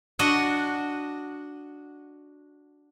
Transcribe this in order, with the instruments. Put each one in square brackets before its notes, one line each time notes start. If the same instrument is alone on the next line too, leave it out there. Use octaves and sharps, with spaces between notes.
[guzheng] D4 F#4 D#5 F#5